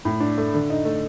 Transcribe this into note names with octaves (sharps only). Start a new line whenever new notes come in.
A2
D4
A3
D3
D#4
A3